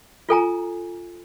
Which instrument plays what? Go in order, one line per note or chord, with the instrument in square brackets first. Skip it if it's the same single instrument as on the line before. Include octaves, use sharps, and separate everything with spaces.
[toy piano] F4 A4 G#5 A#5